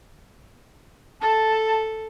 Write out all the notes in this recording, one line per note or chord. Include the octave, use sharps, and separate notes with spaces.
A4 A5